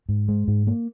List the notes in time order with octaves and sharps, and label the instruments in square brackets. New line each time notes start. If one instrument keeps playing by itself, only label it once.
[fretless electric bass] G#2
G#3
G#2
A#3